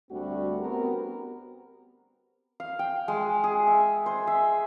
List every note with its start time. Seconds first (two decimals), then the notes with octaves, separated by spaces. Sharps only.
0.10 D2 G3 A3 C4 D4 F#4
0.59 B3 C4 F#4 G4 A#4
2.60 F5
2.79 G5
3.08 G#3
3.44 G#4
3.67 E5
4.06 C5
4.27 E5